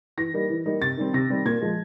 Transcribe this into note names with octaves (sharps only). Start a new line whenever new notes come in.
E3 A#6
G3 A#3 D#4
E3
G3 A#3 D#4
C3 A6
D#3 G3 C4
C3 A#6
D#3 G3 C4
A#2 G#6
F3 G#3